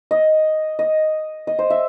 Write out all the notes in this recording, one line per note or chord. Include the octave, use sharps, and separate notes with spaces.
D#5
D#5
D#5
C5
E5